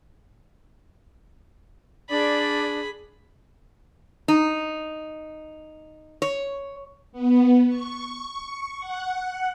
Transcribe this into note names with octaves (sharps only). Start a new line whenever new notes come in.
D4 G#4 D5 B5
D#4
C#5
B3
C#6
F#5